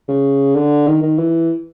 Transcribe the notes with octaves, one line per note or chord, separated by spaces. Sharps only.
C#3
D3
D#3
D#3
E3